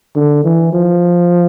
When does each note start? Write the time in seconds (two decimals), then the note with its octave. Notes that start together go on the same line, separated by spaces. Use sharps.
0.16 D3
0.44 E3
0.73 F3